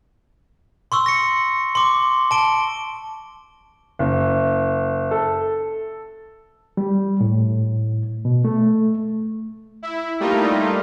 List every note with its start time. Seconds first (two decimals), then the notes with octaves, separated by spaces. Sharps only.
0.92 C6 C#6 E6
1.06 A#6 C#7
1.75 C6 D6
2.31 A5 D7 G7
3.99 F#1
5.11 A4
6.77 G3
7.21 A2
8.25 B2
8.45 A3
9.83 E4
10.20 G3 A3 A#3 D#4 F4